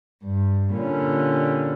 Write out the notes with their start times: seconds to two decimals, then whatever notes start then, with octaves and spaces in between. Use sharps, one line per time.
0.23 G2
0.74 A#2 D3 G3 C#4